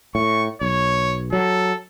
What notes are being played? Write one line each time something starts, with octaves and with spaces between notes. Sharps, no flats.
A2 C#6
B1 C#5
F#3 A4